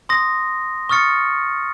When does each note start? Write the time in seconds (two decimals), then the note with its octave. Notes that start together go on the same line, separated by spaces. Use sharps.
0.09 C6 D#6 A#6
0.89 C#6 D#6 F6 A6 C#7